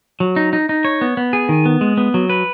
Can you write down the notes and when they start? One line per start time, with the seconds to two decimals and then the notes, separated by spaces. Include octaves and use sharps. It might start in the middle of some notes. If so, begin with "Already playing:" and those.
0.20 F#3
0.36 D#4
0.53 D#4
0.69 D#4
0.85 C#5
1.01 B3
1.17 B3
1.33 G#4
1.49 D#3
1.66 B3
1.81 G#3
1.97 B3
2.14 F#3
2.29 B4